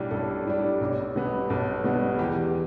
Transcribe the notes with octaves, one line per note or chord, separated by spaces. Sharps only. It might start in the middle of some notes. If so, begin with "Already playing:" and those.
Already playing: B1 A2 G3 D4
B1 A4
A2 G3 D4
B1
B2 G3 B3
B1 A4
B2 G3 B3
E2 G4